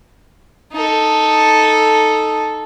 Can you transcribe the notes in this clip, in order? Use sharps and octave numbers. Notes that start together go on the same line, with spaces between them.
D#4 A4